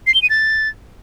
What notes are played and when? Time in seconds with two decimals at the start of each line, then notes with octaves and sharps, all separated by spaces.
0.07 C7
0.14 G7
0.22 D#7
0.30 A6